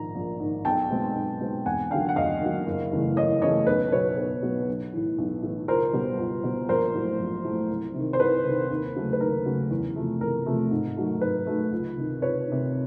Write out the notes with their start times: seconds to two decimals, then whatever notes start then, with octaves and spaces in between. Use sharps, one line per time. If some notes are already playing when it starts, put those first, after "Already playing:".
Already playing: A#1 G#2 D#3 A#5
0.15 A#1
0.40 G#2 D#3
0.65 B1 G5 A5
0.90 B2 G#3 C4
1.15 B1
1.41 B2 G#3 C4
1.65 E1 F#5 G#5
1.91 D#2 D3 F#3 F5 G5
2.09 F#5
2.16 E1 D#5 F5
2.41 D#2 D3 F#3
2.66 F#1
2.91 E2 C#3 E3 A3
3.17 F#1 C#5 D#5
3.42 E2 C#3 E3 A3 C#5 D#5
3.67 B1 B4
3.92 B2 F#3 B3 B4 C#5
4.17 B1 B4
4.43 B2 F#3 B3
4.68 B1
4.93 A2 E3
5.18 B1
5.43 A2 E3
5.68 C#2 A#4 C5
5.93 B2 G3
6.18 C#2
6.44 B2 G3
6.69 A#1 A#4 C5
6.94 A2 F#3 A3
7.19 A#1
7.44 A2 F#3 A3
7.70 C2
7.94 C3 D#3
8.13 C5
8.20 C2 B4
8.45 C3 D#3
8.70 D#2
8.96 C#3 F#3 A3
9.13 B4
9.20 D#2 A#4
9.46 C#3 F#3 A3
9.71 E2
9.96 C3 F3 A3
10.21 E2 A#4
10.46 C3 F3 A3
10.71 G#2
10.96 D#3 F#3 A3
11.21 G#2 B4
11.47 D#3 F#3 A3
11.72 C#2
11.97 C3 D#3
12.22 C#2 B4 C#5
12.47 C3 D#3